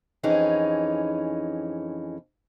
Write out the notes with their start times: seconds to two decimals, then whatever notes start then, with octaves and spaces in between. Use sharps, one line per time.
0.23 F2 E3 C#4 D#4 G#4